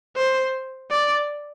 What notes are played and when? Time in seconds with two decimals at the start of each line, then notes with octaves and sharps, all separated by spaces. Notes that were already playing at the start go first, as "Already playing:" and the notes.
0.16 C5
0.90 D5